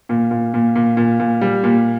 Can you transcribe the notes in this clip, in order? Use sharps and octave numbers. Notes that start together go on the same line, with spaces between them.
A#2
A#2
A#2
A#2
A#2
A#2
G3
A#2